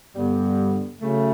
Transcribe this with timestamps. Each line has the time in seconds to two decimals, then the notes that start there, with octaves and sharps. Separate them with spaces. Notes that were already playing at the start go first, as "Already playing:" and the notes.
0.15 G2 D3 G3 B3
1.01 C#3 F#3 A3